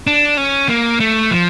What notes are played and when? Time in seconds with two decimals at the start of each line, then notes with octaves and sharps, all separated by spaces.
0.07 D4
0.37 C#4
0.69 A#3
1.00 A3
1.31 F3